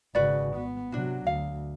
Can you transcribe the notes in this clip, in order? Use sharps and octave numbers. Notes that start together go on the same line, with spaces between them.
G#1 C#3 F#4 B4 D5
B3
C3 F#3 D4 F#4
D2 F5